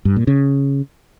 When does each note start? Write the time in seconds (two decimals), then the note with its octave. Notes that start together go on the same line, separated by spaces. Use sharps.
0.05 G2
0.16 A#2
0.27 C#3